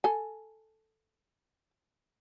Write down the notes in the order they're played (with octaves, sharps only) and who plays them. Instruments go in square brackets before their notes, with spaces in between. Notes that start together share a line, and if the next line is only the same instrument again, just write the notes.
[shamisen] A4 G#5